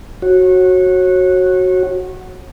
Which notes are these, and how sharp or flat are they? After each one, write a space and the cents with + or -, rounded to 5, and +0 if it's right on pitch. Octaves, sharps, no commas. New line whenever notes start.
F#4 +0 C#5 -30